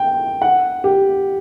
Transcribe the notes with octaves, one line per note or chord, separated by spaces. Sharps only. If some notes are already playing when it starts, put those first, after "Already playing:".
Already playing: G5
F#5
G4